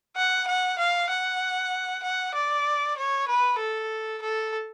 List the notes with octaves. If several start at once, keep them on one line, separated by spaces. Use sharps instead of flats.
F#5
F#5
F5
F#5
F#5
D5
C#5
B4
A4
A4